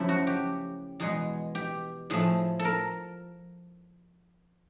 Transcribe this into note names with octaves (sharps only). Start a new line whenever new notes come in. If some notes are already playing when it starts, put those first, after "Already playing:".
Already playing: F#2 C#3 F3 A3 E4
F#4
G4
E2 B2 G#3 G#4
G4
A2 F3 A3 G#4
A4
A#4